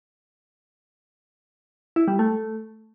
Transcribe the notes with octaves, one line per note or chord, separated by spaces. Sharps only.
E4
G3
A3